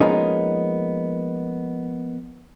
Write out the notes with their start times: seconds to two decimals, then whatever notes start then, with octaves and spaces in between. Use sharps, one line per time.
0.01 F3 G#3 A#3 B3 C#4 D#4